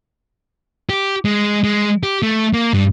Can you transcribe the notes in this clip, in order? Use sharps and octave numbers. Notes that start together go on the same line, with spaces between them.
G4
G#3
G#3
G4
A3
A#3
G2